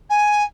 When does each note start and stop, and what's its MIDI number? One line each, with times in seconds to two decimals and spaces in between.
0.09 0.43 80